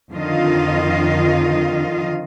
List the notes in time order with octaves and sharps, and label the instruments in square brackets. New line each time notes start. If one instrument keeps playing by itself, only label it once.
[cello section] F2 D3 D#3 F4 D#5 F5